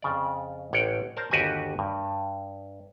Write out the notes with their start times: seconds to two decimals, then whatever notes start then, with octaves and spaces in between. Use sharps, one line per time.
0.02 F2 C#3 D5
0.73 A1 C#5 F#5 G5
1.17 A#4 C5 D5 A5 A#5
1.31 G1 D#2 F#4 G4 B4 G#5
1.79 G2